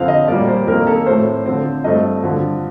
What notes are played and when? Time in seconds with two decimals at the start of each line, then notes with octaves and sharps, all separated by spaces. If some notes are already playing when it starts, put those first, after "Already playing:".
Already playing: F2 D3 F3 C4 F5
0.08 D#5
0.28 A#2 G3 A#3 D5
0.48 C5
0.67 F2 D#3 A#3 A#4
0.87 A4
1.06 A2 A3 C4 C5
1.46 D3 F3 C4
1.84 G2 F3 A3 C4 D#5
2.23 G2 D3 F3